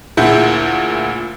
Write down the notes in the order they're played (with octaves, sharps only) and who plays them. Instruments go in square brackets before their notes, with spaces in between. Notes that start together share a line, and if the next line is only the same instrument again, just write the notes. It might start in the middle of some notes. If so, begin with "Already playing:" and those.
[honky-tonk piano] D2 A#2 E4 G#4 F#5 G6